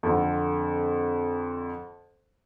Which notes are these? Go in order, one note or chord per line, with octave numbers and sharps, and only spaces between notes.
F2 D3